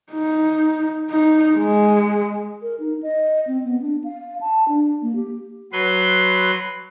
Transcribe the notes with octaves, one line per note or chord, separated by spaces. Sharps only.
D#4
D#4
G#3
A#4
D#4
D#5
C4
B3
D4
F5
A5
D4
A#3
G4
F#3 B4 C6